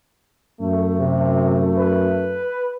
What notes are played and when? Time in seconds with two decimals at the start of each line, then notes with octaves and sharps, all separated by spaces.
0.60 F#2 A3
0.99 C3
1.78 B4